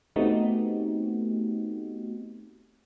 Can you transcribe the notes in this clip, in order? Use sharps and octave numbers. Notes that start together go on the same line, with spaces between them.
A3 B3 C4 D#4 F#4 G4